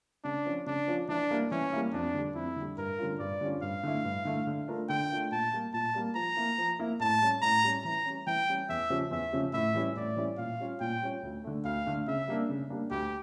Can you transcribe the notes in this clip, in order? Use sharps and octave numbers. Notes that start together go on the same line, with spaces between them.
C#3 D4
F3 C#4 F4
C#3 D4
F3 C#4 F4
E3 D4
G3 A#3 E4
E3 C#4
G3 A#3 E4
F2 D4
D3 G3
F2 E4
D3 G3
G2 A#4
D3 G3 C#4 F4
G2 D5
D3 G3 C#4 F4
G2 F5
D3 A3 E4
G2
D3 A3 E4
D3
A3 D4 F4 A#4
D3 G5
A3 D4 F4 A#4
A#2 A5
G3 A#3
A#2 A5
G3 A#3
F3 A#5
A#3 E4
F3
A#3 E4
A2 A5
G3 C#4
A2 A#5
G3 C#4
E3 A#5
G3 C#4
E3 G5
G3 C#4
E2 E5
C#3 F3 C#4 G4
E2 E5
C#3 F3 C#4 G4
A2 E5
E3 G3 C#4 E4
A2 D5
E3 G3 C#4 E4
A#2 F5
G3 C#4 F4 C#5
A#2 G5
G3 C#4 F4 C#5
D2
D3 A3
D2 F5
D3 A3
C#3 E5
G3 A#3 D4
C#3
G3 A#3 D4
D2 G4